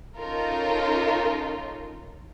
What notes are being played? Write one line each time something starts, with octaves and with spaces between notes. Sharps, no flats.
C#4 D#4 F4 A4 A#4